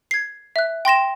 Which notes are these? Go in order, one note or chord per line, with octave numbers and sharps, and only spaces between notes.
G#6 C7
E5 F#6
G5 C6 A#6 E7